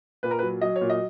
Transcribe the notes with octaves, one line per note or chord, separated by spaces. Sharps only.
A#2 B4
A#4
B4
F#3
F#3 D#5
C#5
A#2
D#5